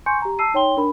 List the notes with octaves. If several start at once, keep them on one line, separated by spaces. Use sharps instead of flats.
G#5 C6 C#6 G6 C#7
G4 A#5
A5 E6 C7 D#7
D#4 C#5 G5 C6 G7
D4 A#4 B5